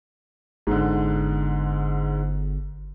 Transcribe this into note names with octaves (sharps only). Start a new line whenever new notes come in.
G1 G#2 D3